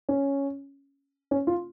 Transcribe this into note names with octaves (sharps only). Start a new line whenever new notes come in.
C#4
C#4
F4